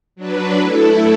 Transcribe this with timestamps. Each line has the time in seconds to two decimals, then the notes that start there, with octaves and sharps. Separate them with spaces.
0.16 F#3 D4 B4
0.60 A3 E4 A4